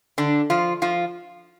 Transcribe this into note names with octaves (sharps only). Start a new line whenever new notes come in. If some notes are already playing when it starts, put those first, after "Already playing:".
D3 D4
F3 F4
F3 F4